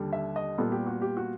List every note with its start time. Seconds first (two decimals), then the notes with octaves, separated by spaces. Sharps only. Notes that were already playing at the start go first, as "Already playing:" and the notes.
Already playing: D#2 D3 G3
0.13 E5
0.36 D#5
0.58 A#2 G3 B3 A4
0.72 G4
0.87 F#4
1.02 G4
1.17 F#4